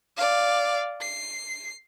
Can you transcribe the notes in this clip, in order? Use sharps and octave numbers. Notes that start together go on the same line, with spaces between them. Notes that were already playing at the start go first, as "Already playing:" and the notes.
D5 F5
C7